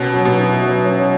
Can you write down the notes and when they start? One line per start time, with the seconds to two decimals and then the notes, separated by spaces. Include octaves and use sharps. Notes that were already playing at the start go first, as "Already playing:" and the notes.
Already playing: B2 C#4
0.13 F#3
0.25 B2
0.37 E4
0.62 F#3
0.85 C#4